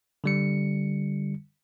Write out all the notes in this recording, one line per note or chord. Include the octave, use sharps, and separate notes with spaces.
D3 G3 C#7